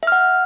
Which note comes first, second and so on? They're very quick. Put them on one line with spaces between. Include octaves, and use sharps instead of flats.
E5 F6 F#5